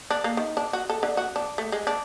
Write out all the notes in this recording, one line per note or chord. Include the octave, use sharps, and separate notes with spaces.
D4
A#3
D#3
D4
F#4
A4
D3
F#4
D4
A3
G#3
D4